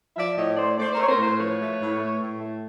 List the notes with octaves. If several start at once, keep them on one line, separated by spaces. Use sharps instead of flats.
F3 D5 E5
A2 C#5 D#5
A3 C5 D5
A3 C5 D5
A#4 C5
A3 C#5
A#4 C5
A2 A#4 C5
F3 B4 C#5
A3
A2
A3
A2
A3